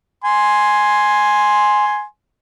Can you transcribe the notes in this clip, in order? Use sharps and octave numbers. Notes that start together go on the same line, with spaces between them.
G#5 C6